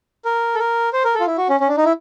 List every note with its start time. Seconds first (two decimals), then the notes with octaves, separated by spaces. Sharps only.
0.25 A#4
0.55 A4
0.59 A#4
0.93 C5
1.04 A#4
1.15 A4
1.20 F4
1.27 E4
1.38 F#4
1.49 C#4
1.60 C#4
1.68 D4
1.77 D#4
1.85 E4